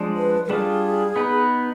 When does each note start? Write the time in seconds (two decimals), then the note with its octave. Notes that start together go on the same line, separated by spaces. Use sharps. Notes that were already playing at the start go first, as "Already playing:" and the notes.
Already playing: F3 G#3 D4
0.16 B4
0.45 B4
0.49 G3 D4 F4 G#4
1.16 B3 D#4 B4